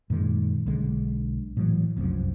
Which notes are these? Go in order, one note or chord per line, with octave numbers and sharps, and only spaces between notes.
F#2 A#2 D#3 G#3
B1 D3 G#3
A2 E3 F#3
F1 C2 F#2 F3